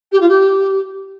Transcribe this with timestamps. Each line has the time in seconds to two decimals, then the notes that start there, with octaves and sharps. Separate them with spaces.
0.11 G4
0.20 F4
0.28 G4